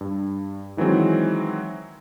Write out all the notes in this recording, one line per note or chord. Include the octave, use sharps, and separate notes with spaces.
G2
D#3 E3 F#3 G#3 C4